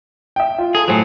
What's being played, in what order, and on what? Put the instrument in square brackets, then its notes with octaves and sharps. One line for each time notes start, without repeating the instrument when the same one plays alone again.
[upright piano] E5 G5
F4
[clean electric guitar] G#4 [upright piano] A4
[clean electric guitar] A2 F#3 [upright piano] C5 G#5